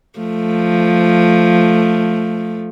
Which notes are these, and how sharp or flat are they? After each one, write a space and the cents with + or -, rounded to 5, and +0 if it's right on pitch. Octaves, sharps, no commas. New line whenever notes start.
F3 +0 A3 +0